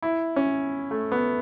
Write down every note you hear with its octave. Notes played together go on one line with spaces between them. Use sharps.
E4
C#4
A3
B3